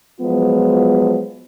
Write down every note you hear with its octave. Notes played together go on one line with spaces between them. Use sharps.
F3 F#3 G#3 B3 F4